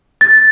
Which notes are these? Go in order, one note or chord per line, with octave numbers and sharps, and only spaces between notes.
A6